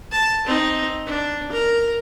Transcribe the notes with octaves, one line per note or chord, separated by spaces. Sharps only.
A5
C4 D#4
D4
A#4